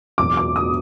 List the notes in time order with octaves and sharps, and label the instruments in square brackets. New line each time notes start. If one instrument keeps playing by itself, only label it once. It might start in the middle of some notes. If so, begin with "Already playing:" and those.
[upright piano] E1 E2 B2 F#3 [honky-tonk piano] D6
[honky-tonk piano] D6
D#6